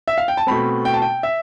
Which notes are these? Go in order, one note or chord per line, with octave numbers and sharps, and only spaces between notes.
E5
F5
G5
A5
B2 A3 C4 B5
G5
A5
G5
E5